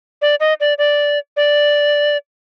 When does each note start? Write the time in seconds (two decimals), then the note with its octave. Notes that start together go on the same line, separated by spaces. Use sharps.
0.22 D5
0.40 D#5
0.60 D5
0.78 D5
1.37 D5